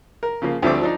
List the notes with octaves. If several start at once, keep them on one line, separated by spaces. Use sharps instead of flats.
A#4
C#3 F3 A#3
D2 F3 G3 A3 C4 D6
F3 D4 D#4